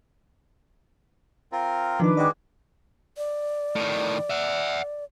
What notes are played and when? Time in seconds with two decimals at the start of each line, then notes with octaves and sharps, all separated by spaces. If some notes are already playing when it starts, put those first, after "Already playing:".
1.52 C4 F4 A#4
2.00 D#3 F3 D4 D#4 B4 D6
2.17 G#3 F#4 D5 D#5 G5
3.17 D5
3.76 A2 D#3
4.30 E5 F#5